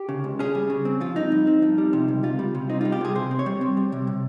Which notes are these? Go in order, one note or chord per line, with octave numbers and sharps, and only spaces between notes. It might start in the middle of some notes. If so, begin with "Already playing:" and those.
Already playing: G4
C#3
C#2
C#4 G#4
G3
C#3
C4
F3 F4
G2 D#4
G2
C4
F3
G3
C3
C#2
C#2 F4
G3
C3
C4 D#4
G3 F4
G4
C3 G#4
C3 C5
C4
C#5
G3
C4
G3
C3
C3